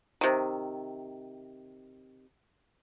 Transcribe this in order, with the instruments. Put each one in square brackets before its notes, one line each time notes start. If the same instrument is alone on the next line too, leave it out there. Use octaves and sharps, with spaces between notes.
[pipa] C3 D#3